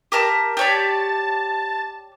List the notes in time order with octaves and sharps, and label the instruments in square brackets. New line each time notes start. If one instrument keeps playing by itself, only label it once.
[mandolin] G4 A#4 A5
[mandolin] G4 C#5 D5 [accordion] A5